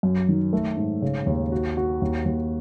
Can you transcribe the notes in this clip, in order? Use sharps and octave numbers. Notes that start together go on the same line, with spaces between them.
F#2
D#3
A3
G#2
C#3
D#2
F#4
F#4
D#2
D#2